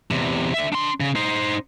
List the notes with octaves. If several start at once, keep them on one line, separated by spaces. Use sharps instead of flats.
E2 C3
D3 E5
D4 C6
C#3
D#4 C5